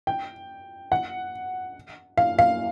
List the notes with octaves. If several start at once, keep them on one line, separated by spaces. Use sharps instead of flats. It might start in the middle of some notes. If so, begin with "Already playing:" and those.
G5
F#5
F5
F5